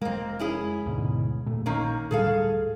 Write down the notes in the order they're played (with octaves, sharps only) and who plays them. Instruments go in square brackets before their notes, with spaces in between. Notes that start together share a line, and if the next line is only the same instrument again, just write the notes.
[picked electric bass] F1 G#3 [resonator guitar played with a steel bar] A#3 C4
[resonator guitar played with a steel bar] C#4 E4 G#4
[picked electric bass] D2 G#2 B2
E1 A#2 A3
[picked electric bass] A#1 [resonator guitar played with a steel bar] D#3 A#3 C#4
[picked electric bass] D1 A2 G3 [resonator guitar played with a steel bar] G#4 A4 F5